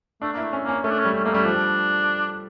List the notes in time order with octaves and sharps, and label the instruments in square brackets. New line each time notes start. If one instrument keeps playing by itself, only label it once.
[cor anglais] A3 [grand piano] D4
[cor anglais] A#3 [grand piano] E4
[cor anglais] A3
[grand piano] C#4
[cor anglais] A#3
[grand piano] C#4
[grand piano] A3 [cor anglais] C#4
[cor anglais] D4
C#4
[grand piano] G3
[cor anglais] C#4
[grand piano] A3 [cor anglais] A#3
[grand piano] G3 [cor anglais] C#4
[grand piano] F3 [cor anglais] D4
[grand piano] G3